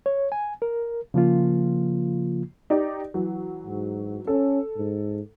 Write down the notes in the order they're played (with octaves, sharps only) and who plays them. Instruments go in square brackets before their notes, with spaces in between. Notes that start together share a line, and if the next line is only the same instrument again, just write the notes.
[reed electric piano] C#5
G#5
A#4
C#3 F3 A#3 F4
[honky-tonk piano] D#4 G4 D5
E3 F#3
[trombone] G#2
[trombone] C#4 [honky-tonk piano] A4
[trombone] G#2